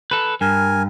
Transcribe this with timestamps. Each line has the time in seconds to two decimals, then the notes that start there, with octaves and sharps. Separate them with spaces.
0.11 A4 B4
0.41 G2 A#4 G#5